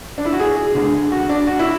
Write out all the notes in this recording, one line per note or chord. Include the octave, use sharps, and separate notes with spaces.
D4
E4
F#4
G#4
D2 D3 G#3
F#4
D4
F#4
E4